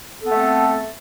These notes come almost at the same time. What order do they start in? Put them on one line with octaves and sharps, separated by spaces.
A4 B3 A3 C4